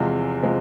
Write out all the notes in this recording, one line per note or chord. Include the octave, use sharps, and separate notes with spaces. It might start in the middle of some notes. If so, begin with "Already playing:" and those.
Already playing: E2 C3 F3 G#3
C3 F3 G#3